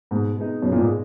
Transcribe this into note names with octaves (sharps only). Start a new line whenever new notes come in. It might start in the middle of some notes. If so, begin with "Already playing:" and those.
G#2 B2
G#3 B3 D#4
F#2 B2
A#2
G#2
G#3